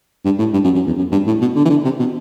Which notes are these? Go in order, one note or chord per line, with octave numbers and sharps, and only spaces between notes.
G2
A2
G2
F#2
F#2
E2
F#2
G2
A2
B2
D3
E3
D3
C3
B2